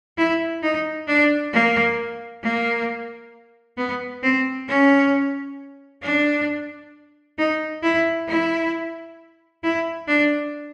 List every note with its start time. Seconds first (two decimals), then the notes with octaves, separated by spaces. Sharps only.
0.17 E4
0.63 D#4
1.07 D4
1.52 A#3
2.43 A#3
3.77 B3
4.22 C4
4.68 C#4
6.02 D4
7.38 D#4
7.83 E4
8.28 E4
9.63 E4
10.08 D4